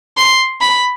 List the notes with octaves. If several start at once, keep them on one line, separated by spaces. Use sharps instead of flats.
C6
B5